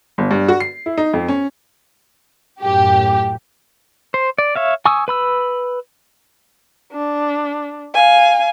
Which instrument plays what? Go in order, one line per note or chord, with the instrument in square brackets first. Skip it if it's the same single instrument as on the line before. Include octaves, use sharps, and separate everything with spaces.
[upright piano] G1
G2
F#4
C7
E4
D#4
F2
C#4
[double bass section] F#2 A2 [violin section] G4
[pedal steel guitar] C5
D5
C#5 E5 F5
G#5 C#6 D#6 E6
B4 B5 E6
[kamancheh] D4
F5 G#5